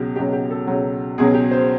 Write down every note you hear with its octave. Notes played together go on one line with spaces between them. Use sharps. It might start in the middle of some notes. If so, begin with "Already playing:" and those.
Already playing: C#2 B2 F#3 G4
C#2 B2 F#3 G4
G4
A4
C#2 B2 F#3
C#2 B2 F#3 G#4
G4
C5